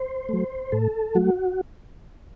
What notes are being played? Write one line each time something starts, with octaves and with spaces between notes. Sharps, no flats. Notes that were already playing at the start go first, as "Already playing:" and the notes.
Already playing: C5
F#3 A3
A2 A4
F#3 A3 F#4